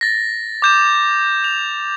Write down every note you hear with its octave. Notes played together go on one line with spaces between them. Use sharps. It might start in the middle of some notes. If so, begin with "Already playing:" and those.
A6 A#6
D6 G6 E7
F7